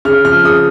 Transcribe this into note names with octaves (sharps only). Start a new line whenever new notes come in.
C#3 F6
F3 F6
C#3 D#6